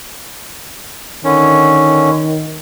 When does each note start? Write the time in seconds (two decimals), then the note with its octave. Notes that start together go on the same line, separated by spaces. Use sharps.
1.24 D3 D#3 C#4